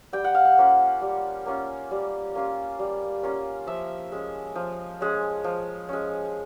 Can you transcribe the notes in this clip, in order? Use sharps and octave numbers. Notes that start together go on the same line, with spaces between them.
G3 G5
F#5
F5
F#5
A#3 C#4 F4
G3
A#3 C#4 F4
G3
A#3 C#4 F4
G3
A#3 C#4 F4
F3 E5
G#3 C#4
F3
G#3 C#4
F3
G#3 C#4